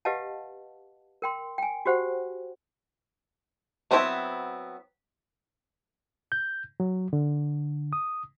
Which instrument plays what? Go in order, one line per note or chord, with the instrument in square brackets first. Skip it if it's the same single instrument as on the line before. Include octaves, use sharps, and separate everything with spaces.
[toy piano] G4 B4 D#5 F5 F#5 A5
A#4 G5 C6
G5 G#5
F#4 G4 C5 F#5
[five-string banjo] F#3 B3 C4 D4 E4
[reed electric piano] G6
F#3
D3
D#6